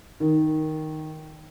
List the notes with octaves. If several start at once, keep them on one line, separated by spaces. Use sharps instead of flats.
D#3